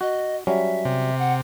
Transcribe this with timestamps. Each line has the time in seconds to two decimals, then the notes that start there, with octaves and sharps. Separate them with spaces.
0.01 F#4 D#5
0.47 F#3 G3 C#4 E5
0.85 C3
1.19 F#5